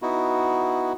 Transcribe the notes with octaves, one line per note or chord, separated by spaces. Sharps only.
B3 D#4 E4 F#4